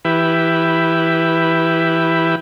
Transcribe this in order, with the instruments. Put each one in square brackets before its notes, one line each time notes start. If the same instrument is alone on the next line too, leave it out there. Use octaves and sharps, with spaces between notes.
[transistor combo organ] E3 E4 G4 B4